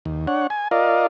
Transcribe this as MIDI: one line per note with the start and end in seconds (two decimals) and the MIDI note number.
0.05 0.26 39
0.27 0.47 62
0.27 0.47 73
0.27 0.47 78
0.50 0.68 80
0.71 1.07 65
0.71 1.07 70
0.71 1.07 74
0.71 1.07 75
0.71 1.07 77